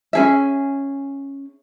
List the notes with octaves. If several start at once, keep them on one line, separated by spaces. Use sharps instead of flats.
C#4 G#4 E5